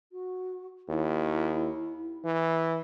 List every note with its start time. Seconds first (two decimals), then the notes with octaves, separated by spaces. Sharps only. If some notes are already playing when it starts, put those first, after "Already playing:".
0.12 F#4
0.89 D#2 E4
2.24 E3